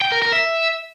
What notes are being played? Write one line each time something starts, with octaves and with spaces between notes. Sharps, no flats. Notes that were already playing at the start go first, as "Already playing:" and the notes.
G5
A#4
A#4
E5